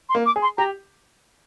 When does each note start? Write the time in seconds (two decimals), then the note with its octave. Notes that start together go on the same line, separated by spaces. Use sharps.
0.09 C6
0.15 A#3
0.26 D6
0.36 G#4
0.42 C6
0.58 G4 A#5